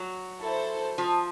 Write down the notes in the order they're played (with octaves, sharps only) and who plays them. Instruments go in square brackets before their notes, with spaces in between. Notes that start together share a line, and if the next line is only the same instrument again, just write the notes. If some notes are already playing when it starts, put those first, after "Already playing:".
Already playing: [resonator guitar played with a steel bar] F#3
[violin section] E4 A4 C5
[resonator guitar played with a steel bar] F3